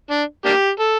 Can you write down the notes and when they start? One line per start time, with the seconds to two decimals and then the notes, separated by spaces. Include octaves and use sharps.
0.10 D4
0.45 A#3 D4 G4
0.80 A4